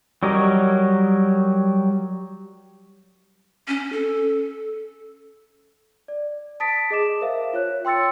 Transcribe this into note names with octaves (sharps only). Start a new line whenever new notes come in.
F#3 G3 A#4 C#5 D#5
C#4
A4
D5
A5 D#6 A6 B6 D7
G#4 D#5 D6 E7
A#4 C5 E5 F5
F4 C#5 F#6
G5 C6 E6 A6 C#7